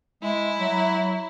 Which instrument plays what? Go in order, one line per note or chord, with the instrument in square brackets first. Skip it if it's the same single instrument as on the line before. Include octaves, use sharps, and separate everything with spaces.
[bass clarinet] G#3 [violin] E4
[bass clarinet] F#3